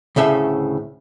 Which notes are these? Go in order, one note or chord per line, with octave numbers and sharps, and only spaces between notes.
D2 A2 C#3 A4 E5